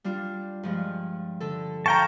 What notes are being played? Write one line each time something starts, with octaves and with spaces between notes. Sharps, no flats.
G3 D4 F4
G2 F3 G#3
D3 A4
F5 G5 A5 A#5 C#6